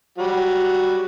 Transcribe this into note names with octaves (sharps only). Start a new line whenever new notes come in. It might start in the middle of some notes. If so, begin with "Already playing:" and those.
F#3 G3 F#4